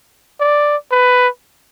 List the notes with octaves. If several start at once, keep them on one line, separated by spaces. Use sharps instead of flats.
D5
B4